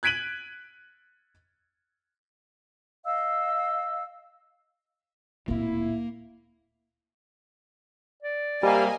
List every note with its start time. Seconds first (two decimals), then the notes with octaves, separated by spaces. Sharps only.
0.03 F#6 G#6 B6 D7 D#7 F#7
3.04 D#5 F5 E6
5.48 D1 A#2 A#3 E4
8.23 D5
8.63 C3 G3 A#3 D#5 G#5